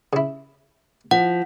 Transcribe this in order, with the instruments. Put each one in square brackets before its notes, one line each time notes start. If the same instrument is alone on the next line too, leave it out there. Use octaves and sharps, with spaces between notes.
[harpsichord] C#3 E4
[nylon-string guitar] F3 [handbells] F#5